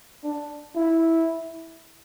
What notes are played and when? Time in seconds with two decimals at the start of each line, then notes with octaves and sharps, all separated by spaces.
0.24 D4
0.75 E4